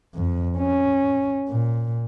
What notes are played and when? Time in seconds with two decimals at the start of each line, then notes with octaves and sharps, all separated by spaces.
0.14 F2
0.57 C#4
1.49 A#2